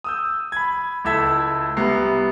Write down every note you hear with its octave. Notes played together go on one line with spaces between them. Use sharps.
D#6 E6 G6
B5 G#6
C#2 E4 A4 E6 G#6 B6
C2 G3 B3 A#5 C7